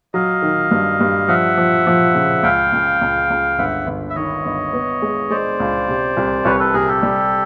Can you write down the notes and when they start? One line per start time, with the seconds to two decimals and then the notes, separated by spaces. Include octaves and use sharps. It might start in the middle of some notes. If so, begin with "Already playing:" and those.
0.14 F#3 D#5 F5
0.42 D#3
0.71 G2
1.00 G2
1.28 F3 E5 F#5
1.57 F3
1.87 F3
2.15 C#3
2.43 C#2 F5 G5
2.73 C#2
3.01 C#2
3.30 C#2
3.58 G1 E5 F#5
3.86 G1
4.10 E5
4.15 D#3 C#5 D#5
4.45 G1
4.73 B3
5.02 G#3
5.30 G#3 C5 D5
5.60 C#2
5.88 C3
6.17 C2
6.45 C2 B4 C#5
6.60 A4 B4
6.74 C3 G#4 A#4
6.88 G4 A4
7.03 G3